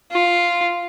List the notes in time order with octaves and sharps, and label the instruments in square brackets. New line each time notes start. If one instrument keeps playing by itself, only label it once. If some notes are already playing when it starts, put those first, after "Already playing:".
[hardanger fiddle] F4